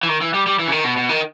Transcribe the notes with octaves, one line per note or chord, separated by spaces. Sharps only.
E3
D#3
E3
G3
G3
E3
C#3
D#3
B2
B2
D#3